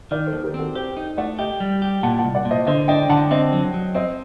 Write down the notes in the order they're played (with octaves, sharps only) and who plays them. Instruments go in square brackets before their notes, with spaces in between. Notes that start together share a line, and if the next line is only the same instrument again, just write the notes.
[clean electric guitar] D#3 [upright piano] A#4 D5
[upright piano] A4 C5
[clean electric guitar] D#2
[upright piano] G4 A#4
[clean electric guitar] C4 [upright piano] F#4 A4
[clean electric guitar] G4 [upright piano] A4 C5
[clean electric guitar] D#4
[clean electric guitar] A3 [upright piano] D5 F#5
[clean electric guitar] G4 [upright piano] D#5 G5
[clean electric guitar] G3
G4
[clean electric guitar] A#2 [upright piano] F#5 A5
[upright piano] F#5 A5
[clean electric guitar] C2
[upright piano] D5 F#5
[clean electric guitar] A#2
[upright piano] C5 D#5
[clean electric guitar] D3 [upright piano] C5 D#5
[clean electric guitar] D4 [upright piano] D#5 G5
[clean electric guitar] D3 [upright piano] F#5 A5
[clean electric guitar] C4 [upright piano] C5 D#5
[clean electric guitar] F#3
F#3
[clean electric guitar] C4 [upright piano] C5 D#5